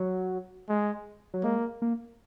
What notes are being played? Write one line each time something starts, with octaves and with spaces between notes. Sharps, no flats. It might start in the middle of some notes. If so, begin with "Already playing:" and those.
Already playing: F#3
G#3
F#3
G#3 A#3
A#3